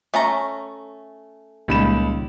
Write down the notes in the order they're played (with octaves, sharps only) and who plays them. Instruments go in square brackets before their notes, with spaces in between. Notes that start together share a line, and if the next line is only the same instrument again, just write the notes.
[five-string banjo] A3 C#4 A#5
[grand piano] C#2 B5 E7 [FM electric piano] A#2 D#3 G3